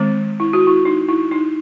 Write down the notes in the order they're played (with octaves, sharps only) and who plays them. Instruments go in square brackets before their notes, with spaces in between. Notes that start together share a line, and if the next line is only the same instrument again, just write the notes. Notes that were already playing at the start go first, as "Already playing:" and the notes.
Already playing: [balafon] D#3 G#3 C4
E4
F#4
E4
D#4
E4
D#4